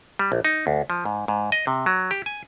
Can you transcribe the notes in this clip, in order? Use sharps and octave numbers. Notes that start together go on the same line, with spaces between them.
G3
A#1
D#4
D2
F3
G#2
G#2
D#5
C3
F#3
G4
G#5